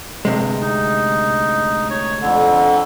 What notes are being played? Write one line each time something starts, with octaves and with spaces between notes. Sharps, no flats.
D2 G2 C3 G#3
D#4
C#5
F2 D3